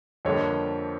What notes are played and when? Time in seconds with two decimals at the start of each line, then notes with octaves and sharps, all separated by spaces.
0.25 F2 D3 G3 A#3 C#5 D#5